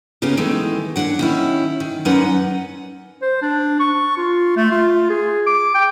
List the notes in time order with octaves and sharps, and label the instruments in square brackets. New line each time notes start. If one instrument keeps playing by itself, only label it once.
[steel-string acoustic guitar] C#3 B3 C#4 D#4 G4
D#3 E3 G#3 A3
D#2 G#2 D4 F#5
D#3 C#4 E4
D#3
F#2 C#4 D#4 B4 D5 F#5
[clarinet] C5
D4
C#6
F4
A3
F4
G#4
D6
G5